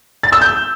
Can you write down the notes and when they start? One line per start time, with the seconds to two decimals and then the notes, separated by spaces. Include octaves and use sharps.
0.23 A6
0.32 E6
0.41 G6